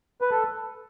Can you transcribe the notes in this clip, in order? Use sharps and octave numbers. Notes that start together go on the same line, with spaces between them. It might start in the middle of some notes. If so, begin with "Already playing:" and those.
B4
A4